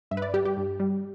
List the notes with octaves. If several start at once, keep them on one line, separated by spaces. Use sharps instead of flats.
G2 E5
B4
D5
G3 G4
G4
G2
G3